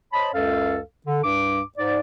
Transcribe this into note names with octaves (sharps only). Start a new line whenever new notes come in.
C5 C#5 D#5 A5 B5
C#2 F#2 A4 F5
D3
C2 G2 D6
G#2 D5